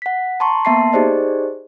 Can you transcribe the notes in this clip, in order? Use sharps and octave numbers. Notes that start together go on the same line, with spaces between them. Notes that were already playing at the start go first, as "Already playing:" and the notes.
F#5 B6
A5 A#5 C6 C#6
A#3 B3 E5 A5 C6 C7
D#4 G4 G#4 C5 D5 D#5